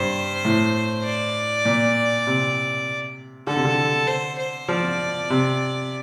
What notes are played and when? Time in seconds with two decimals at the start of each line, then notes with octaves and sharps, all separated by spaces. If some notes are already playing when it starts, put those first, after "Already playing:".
Already playing: G2 C5
0.45 A2
1.05 D5
1.65 A#2
2.27 C3
3.47 D3 A4
3.56 C3
3.65 D3
4.08 C5
4.38 C5
4.68 F3 D5
5.30 C3